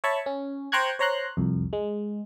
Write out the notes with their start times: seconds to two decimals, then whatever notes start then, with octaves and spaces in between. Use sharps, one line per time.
0.04 C#5 E5 A5 B5 C#6
0.26 C#4
0.72 C5 G5 A#5 C#6 F#6 G#6
0.99 C5 C#5 A#5 C6 F#6
1.37 C2 F2
1.73 G#3